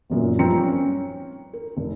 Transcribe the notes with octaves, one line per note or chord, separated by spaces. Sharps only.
G1 F#2 A#2
G2 F3 C4 A#5 C#7
C#4
A#4
F1